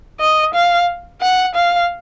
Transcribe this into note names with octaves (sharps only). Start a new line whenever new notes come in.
D#5
F5
F#5
F5